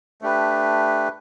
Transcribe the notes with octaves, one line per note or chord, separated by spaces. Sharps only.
A3 D4 G4 B4